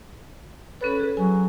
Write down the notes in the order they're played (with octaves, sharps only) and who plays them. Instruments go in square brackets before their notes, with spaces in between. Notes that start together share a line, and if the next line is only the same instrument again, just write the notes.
[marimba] C#4 A4 C#5 [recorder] B4
[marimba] G#4
[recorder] F#3 [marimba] G#5